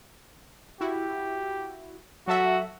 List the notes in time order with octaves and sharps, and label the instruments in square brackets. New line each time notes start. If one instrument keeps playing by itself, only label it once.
[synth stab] E4 F#4 [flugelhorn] G4
[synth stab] F#3 A4 E5 [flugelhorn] F#4